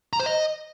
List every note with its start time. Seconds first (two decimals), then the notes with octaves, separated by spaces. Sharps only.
0.13 A#5
0.20 C5
0.26 D#5